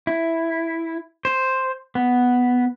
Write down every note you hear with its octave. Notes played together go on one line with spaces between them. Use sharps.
E4
C5
B3